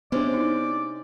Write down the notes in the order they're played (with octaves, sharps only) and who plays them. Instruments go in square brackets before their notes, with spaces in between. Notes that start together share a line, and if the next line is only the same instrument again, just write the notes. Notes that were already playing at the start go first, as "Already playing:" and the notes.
[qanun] C3 G#3 C#4 [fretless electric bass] B3 D4 [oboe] D5
[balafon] D#4 E4